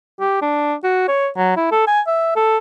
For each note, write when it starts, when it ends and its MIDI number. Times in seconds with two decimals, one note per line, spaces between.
0.20 0.39 67
0.42 0.74 62
0.84 1.06 66
1.08 1.29 73
1.37 1.56 54
1.57 1.71 64
1.71 1.85 69
1.87 2.01 80
2.07 2.35 76
2.36 2.58 69